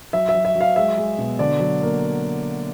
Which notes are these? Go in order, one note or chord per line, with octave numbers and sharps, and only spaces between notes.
F#3 E5
E5
F#3
E5
F#3
F5
G#3 E5
G#3
B2
D3 D5
F#3
A#3